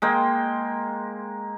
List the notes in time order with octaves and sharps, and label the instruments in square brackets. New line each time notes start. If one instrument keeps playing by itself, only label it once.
[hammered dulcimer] G#3 A#3 G5